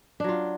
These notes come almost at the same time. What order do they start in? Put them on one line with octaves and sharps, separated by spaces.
D4 F#3 F4